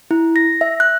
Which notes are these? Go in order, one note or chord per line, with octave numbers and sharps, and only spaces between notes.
E4
A#6
E5
F#6